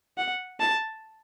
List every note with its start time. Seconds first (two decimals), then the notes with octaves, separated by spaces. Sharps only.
0.18 F#5
0.60 A5